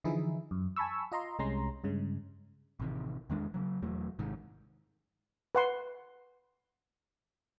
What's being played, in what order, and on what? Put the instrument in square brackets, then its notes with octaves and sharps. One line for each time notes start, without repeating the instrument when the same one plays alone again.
[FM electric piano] D3 E3 F3 D#4 E4 G#4
F#2
G#5 A5 B5 C#6 E6
F4 D#5 A#5 C6
C2 C3 G#3 C#4 A#5 C6
G2 C#3 G#3
[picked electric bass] A1 C3 D#3
E2 D#3 G#3 D4
C#3 F#3
E1 E2 F#3 A3
G#1 G#2 C3 D#3
[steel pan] B4 F#5 C6